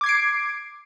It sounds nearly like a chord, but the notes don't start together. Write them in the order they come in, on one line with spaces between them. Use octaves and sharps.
D6 G#6 C7 D7